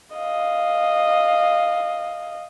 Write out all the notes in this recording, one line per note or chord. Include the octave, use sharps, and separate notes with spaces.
D#5 F5